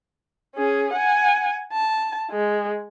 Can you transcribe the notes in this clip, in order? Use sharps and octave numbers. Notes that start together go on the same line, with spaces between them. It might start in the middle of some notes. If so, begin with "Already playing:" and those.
C#4 G#4
F#5 G#5
A5
G#3